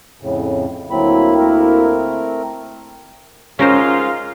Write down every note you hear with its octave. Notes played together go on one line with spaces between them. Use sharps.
F2 A2 C#3
D2 F#3 A#3 C4 E4 B5
A3 C4 A#4
G#2 C#4 F4 A#4 C5